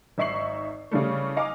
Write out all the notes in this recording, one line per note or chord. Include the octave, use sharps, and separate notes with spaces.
G#1 D#4 E5 C#6 C7 F#7
C#3 E3 G3 A3
D#4 D#5 F5 G#5 A#5 D6